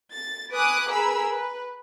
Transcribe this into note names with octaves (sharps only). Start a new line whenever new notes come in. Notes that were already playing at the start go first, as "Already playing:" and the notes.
A6
B4 G#5 D6 D#6 F#6
G#4 A#4 B4 B5 E6
B4